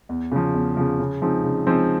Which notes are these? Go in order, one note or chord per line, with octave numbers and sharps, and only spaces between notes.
E2
C#3 F3
E2
C#3 F3
C#3
F3 G#3 C4 D#4
C#3
F3 G#3 C4 D#4